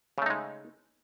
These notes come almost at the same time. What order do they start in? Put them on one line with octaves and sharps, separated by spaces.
C#3 A3 D#4 G#3